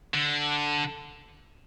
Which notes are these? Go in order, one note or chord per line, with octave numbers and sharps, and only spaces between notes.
D3